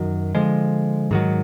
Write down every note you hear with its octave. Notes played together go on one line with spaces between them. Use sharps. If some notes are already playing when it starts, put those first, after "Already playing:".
Already playing: F#2 D#3 F#3
D3 F3 G#3
G#2 D#3 F#3